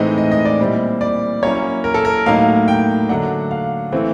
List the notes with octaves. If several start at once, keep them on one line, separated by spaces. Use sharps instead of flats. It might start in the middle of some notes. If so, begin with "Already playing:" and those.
Already playing: A2 E3 G#3 C4 D#4 D#5
D#5
D#5
D5
A#2 G3 C4 E4
D5
F#3 A#3 C#4 E4 C#5
A#4
A4
A#4
A2 F#3 A#3 D#4 F5
G5
D3 F#3 A3 D4 F#5
F5
E3 A3 C4